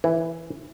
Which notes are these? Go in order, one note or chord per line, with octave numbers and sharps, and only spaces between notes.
E3